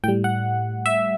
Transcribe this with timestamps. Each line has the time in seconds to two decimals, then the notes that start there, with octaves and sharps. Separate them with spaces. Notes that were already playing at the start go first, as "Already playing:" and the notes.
0.04 A2 G3 G5
0.24 F#5
0.86 E5